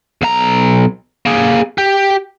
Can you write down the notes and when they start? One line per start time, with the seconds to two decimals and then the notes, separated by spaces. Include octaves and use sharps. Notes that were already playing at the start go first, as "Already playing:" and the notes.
0.22 B1 A#5
1.26 A#3 G#4
1.78 G4